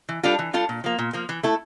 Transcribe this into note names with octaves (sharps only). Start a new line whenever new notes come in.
E3
G3 D4 F4 A4
E3
G3 D4 F4 A4
A#2
F3 A#3
A#2
F3 A#3
E3
A3 E4 A4